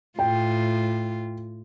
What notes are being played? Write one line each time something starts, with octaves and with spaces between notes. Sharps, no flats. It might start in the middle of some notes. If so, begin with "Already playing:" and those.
A2 F4 G5